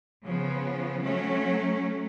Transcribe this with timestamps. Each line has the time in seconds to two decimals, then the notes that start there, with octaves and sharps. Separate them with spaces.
0.25 C#3 F3 B3
1.03 F#3 A3 C#4